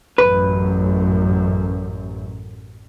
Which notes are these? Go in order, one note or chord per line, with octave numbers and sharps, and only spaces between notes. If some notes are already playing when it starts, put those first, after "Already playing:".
A1 F#2 B4